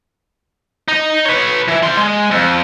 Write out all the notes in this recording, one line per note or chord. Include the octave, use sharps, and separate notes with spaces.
D#4
B4 C#5
E3 E4
G3 C6
G#3
F2